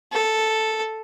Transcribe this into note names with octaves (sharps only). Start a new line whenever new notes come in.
A4